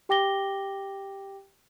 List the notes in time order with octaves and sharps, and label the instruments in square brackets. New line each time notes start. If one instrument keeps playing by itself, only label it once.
[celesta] G4 G5 D6 A#6 G7